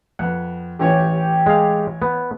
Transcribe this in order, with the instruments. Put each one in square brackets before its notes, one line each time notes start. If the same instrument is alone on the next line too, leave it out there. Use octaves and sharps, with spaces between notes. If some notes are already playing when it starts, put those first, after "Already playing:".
[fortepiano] F2 B3 [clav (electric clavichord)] F#5
[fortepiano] A1 E3 C#5 [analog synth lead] G4
[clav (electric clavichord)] G#3 F5
B3